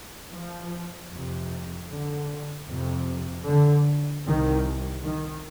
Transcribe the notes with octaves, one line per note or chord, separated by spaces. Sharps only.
F3
F2 C3
D3
F2 C3
D3
C2 C3 D#3
D#3